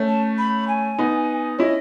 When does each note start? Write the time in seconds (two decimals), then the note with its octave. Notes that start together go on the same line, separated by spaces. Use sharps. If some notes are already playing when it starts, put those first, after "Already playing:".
Already playing: A3 C#4
0.08 A5
0.38 B5
0.68 G#5
0.98 B3 D#4
1.58 C#4 E4 D#5